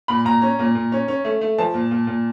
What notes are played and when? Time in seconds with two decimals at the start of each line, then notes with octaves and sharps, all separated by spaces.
0.08 A#2 B5
0.25 A#2 A#5
0.42 C#4
0.59 A#2
0.75 A#2
0.92 C#4
1.08 C#4
1.24 A3
1.41 A3
1.58 F3 A5
1.74 A#2
1.91 A#2
2.07 A#2